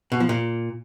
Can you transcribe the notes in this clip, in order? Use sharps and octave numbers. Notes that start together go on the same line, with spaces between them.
B2
F3
A#2